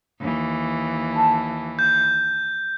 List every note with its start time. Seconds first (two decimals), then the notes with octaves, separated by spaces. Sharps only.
0.20 D#2 E3
1.13 A4 A5
1.79 G6